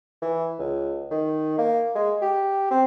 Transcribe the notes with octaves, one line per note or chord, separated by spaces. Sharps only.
E3
C#2
D#3
A#3
G#3
G4
C4